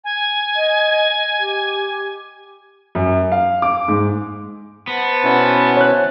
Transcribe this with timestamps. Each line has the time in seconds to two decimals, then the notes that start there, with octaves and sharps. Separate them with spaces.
0.04 G#5
0.56 D#5
1.39 G4
2.95 F#2
3.32 F5
3.62 D6
3.88 G#2
4.88 B3 C5 F#5 A5
5.24 B2 C#4 E4
5.77 C#5 F#6